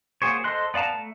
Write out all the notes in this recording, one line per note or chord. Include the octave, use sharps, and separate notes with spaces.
A#3 F#4 G#4 C5 C#5
A4 C5 D#5 C6 F#6
B3 D5 F5 A5 A#5
A3